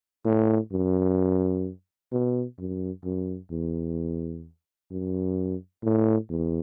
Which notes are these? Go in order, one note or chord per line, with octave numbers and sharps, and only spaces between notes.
A2
F#2
B2
F#2
F#2
E2
F#2
A2
E2